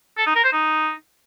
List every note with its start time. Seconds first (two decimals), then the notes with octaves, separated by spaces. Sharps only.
0.18 A4
0.26 D#4
0.35 A#4
0.44 C5
0.53 D#4